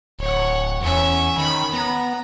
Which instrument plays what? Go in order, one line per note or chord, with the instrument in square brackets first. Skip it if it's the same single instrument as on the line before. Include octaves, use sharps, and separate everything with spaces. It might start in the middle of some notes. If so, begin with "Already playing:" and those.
[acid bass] D1 [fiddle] C#5 F#5
[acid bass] E2 [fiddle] C#4 E5
[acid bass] D#3 [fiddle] B5
[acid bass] B3 [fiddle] A#5